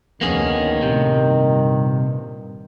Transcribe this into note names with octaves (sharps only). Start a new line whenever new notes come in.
F1 D2 D#3 A#3 B3 C#4 G#4
A2 C3
G2 A#2